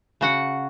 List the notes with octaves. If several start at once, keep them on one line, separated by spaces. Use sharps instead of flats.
C#3 F#4 F#5